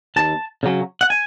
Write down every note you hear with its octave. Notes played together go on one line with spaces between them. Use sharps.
D#2 A5
C#3 F#3 C#4
F#5
G#5